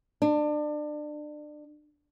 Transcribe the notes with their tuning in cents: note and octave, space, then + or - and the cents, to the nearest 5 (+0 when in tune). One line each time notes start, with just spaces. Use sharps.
D4 +30